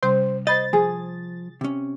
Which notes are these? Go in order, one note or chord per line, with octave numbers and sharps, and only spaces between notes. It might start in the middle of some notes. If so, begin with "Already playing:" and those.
C3 G3 C#4 C5
C5 D#5 B5 G6 A6
F3 G#4
C3 C#4